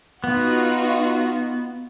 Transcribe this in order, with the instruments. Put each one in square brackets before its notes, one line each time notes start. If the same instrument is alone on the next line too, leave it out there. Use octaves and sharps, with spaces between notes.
[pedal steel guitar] B3 [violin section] D#4 F4 F#4